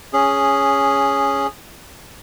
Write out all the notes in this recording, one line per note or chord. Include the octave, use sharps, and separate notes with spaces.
C#4 G#4